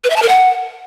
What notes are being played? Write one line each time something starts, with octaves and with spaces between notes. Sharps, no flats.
B4
E5
A5
A#4
F#5